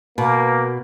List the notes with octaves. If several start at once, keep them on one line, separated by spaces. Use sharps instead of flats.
B2 A#3